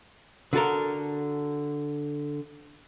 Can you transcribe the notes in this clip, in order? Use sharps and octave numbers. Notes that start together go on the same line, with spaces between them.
D3 F#4 A4 A#4